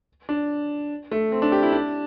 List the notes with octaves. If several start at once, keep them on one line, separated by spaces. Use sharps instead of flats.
D4
A3
C4
D4
G4
E4
D4